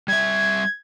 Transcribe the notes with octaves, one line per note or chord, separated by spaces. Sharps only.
G3 E5 G#6